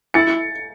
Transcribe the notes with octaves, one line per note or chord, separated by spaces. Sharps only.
E4 A6 C#7